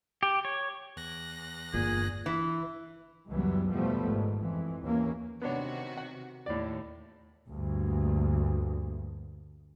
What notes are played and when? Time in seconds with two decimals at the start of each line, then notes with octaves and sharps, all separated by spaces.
0.23 G4
0.45 C#5
0.97 E2 F#6 A#6
1.73 G1 G2 A#2 G#4
2.26 E3
3.30 C#2 F#2 E3 F#3 G3 B3
3.70 E2 B2 F3 G3 A3 B3
4.06 G#1 G#2
4.40 F2 E3
4.84 D#2 E3 A#3 C#4
5.42 C3 D#3 B3 D4 F#4 C#5
5.97 F#5
6.46 D#2 A2 D5
7.49 D2 G2 A#3